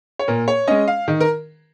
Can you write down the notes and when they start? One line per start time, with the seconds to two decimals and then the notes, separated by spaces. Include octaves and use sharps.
0.19 C#5
0.28 A#2 A#4
0.48 C#5
0.68 G#3 C#4 D#5
0.88 F5
1.08 D#3
1.20 A#4